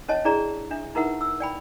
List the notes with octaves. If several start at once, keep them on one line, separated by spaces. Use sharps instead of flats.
C#4 C#5 D#5 A5
D4 E4 G#4 D5 A#5
D4 E5
D#4 E4 A#4 B4 E5 F#5
E6
D5 G5 B5